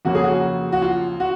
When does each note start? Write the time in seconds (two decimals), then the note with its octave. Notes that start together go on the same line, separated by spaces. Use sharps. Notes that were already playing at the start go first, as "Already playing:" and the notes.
0.05 F2 C#3 F#3 A#3 F#4
0.15 G#4
0.24 F#4
0.72 F#4
0.82 F4
1.20 F#4